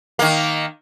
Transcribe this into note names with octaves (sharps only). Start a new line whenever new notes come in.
D#3 A#3